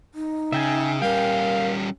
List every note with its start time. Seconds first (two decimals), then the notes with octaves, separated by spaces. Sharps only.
0.14 D#4
0.52 C#3 E5 G5 G#5
1.02 G3 C#4 A#4 F5 G5